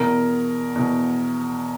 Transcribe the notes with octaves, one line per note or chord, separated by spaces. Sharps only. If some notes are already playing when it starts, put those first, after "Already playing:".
Already playing: E2 B2 A#4
E2 B2